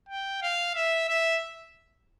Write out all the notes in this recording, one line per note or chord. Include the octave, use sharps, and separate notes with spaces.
G5
F5
E5
E5